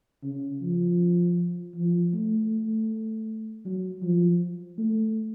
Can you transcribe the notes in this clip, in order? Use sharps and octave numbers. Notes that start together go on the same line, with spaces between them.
C#3
F3
F3
A3
A3
F#3
F3
A3